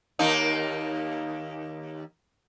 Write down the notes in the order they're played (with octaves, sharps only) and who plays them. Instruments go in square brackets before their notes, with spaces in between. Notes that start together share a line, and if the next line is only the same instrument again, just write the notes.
[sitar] D#2 A#3 D#4